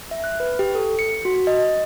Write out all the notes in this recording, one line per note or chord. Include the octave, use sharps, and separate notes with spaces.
E5
F#6
B4
G4
A4
C#7
F#4
D#5